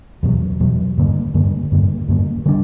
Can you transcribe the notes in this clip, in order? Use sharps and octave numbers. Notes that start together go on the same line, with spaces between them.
E2 B2 F#3
E2 B2 F#3
G2 D3 A#3
G2 D3 A#3
G2 D3 A#3
G2 D3 A#3
D3 G3 B3 D4